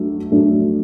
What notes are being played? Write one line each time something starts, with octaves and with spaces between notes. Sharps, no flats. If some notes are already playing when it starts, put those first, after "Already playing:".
Already playing: F#3 A3 D4
F#3 A3 D4